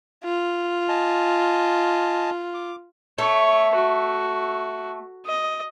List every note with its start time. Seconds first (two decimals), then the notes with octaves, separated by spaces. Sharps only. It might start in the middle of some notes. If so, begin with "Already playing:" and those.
0.25 F4
0.88 D#5 G#5 A5
2.54 D6
3.18 A3 C#5
3.75 F#4
5.26 D#5